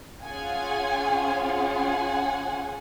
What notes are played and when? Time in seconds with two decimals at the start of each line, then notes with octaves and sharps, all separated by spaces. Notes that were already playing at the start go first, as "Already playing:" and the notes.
0.23 C#4 F4 G#4 F#5 G#5
1.43 F#5 G#5